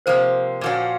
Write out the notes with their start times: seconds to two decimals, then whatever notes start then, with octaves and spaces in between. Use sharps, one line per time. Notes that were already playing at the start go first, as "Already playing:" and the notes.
0.06 C3 F3 A#3 C5
0.61 A#2 F3 A#3 C#4 F#4